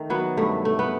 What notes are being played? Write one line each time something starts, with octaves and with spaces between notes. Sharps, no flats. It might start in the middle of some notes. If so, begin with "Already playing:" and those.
Already playing: D#3 A3 D#4
F#3 B3
G2 A3
A3
B3